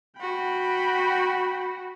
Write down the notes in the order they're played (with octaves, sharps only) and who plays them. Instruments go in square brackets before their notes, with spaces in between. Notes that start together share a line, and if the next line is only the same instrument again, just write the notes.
[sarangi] F#4 [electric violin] G5 B5